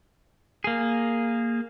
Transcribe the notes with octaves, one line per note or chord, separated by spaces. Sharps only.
A#3 G#4